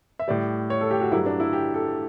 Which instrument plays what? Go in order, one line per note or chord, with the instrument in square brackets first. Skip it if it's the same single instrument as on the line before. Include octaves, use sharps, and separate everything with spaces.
[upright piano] E5
A2 G3 D5
C#5
A4
G4
F#4
G2 F#3 A3 E4
D4
E4
G4
A4